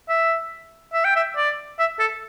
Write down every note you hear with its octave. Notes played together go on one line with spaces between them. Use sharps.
E5
E5
G5
E5
D5
E5
A4